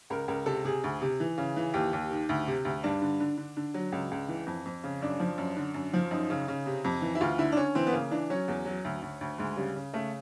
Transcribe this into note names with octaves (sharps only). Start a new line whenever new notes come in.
C#2 A#4
C#2 A#4
C3 A4
C3 G#4
D2
C3
E3
C#3
E3
D#2 G4
D#2
D#3
D2
C3
D2
G2 D4
D3
D3
D3
D3
F#3
C#2
C#2
E3
F2
F2
C#3
F#2 D4
F3
F#2
D3
F#2
F3
F#2 D#4
C#3
C#3
C3
F2
E3
E4
D2 F4
D3 E4
D4
D3 C#4
E3 C4
B3
C#3 A#3
E3 D4
F#3 C#4
E2
F#3
D2
D2
D2
D2 G#3
C#3 G3
C#3
C#3 A3